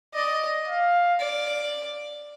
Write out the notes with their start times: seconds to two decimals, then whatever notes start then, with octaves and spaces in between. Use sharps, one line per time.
0.14 D5 D#5
0.68 F5
1.20 D5